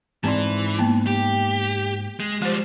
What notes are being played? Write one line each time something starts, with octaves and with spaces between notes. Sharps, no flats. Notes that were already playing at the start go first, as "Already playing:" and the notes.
G#2 E3 C4 D5 C6
A#3 B3
G4
G#3
F3 G3 G#3 C5